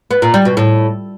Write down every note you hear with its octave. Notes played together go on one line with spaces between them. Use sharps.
B3
A#2
G3
B2
A2